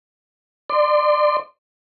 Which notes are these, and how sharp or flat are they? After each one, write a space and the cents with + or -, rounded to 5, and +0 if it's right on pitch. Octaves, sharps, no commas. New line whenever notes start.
D5 +25 C6 -20